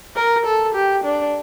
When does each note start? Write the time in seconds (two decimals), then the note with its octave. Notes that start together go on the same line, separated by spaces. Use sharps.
0.16 A#4
0.45 A4
0.75 G4
1.04 D4